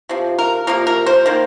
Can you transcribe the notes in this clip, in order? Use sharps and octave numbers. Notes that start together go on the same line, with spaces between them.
C3 F3
A#4
C3 F3 A#3 A#4
A#4
C5
D#3 A#3